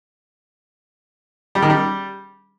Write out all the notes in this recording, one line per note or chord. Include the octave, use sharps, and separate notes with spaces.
G3
D#3
G3